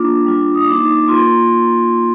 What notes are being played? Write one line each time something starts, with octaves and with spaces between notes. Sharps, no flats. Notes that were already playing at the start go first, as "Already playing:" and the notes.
Already playing: A#3 D4 F4 D6
G3 D4 F4
D#6
A#3 D#4 D6
A#3 F4 C6